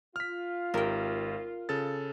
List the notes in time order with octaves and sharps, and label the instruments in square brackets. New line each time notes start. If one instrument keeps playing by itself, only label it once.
[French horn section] F4 [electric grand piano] F6 B6
[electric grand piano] G#1 G4 [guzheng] A#4 G5
[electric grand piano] C#3 A4 A6